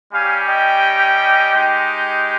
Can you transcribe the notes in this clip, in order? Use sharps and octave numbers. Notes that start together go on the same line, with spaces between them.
G3 C#4 G4 F5 G#5
D#5 G5
G#3 D#4 G4